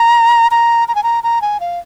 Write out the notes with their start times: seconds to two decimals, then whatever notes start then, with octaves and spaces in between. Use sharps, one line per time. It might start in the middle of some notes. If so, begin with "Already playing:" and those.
Already playing: A#5
0.51 A#5
0.88 A#5
0.95 G#5
1.03 A#5
1.23 A#5
1.42 G#5
1.60 F5